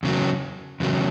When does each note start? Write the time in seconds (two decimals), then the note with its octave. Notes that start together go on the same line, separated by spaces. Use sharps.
0.03 E2 C#3 F#3
0.80 E2 C#3 F#3